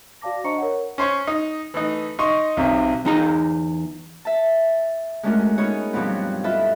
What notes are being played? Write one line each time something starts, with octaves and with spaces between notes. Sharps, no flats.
F#4 D5 F5 A5 D6 A#6
D4 C5 D#5 A#5 C#6 C#7
A#4 C#5 F#5
C#4 C5 C#5
D#4
E3 A3 D#4
D#4 D#5 C6 C#6
B1 C3
E2 D#4 A#5
E5 A5
G#3 A3 C#4 D4 F#4 A#4
B3 D#4 G#4 A#4 C#5 D#5
G2 B2 F3 F#3 B3 C4
E4 F4 A4 B4 D#5 E5